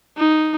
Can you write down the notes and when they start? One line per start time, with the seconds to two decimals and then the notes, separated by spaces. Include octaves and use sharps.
0.17 D#4